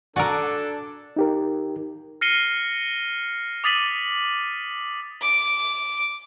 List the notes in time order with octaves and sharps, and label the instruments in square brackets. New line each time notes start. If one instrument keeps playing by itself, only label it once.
[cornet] D4 [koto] F#4 A#4 [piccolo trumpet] A4 [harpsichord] D5 G#5
[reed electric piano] D#4 G4 A#4
[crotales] F6 A#6 C7 C#7 D#7 G7
D6 D#6 A6 B6 D#7 F#7
[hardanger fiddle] D6